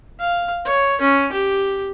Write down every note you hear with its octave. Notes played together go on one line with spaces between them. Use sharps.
F5
C#5
C#4
G4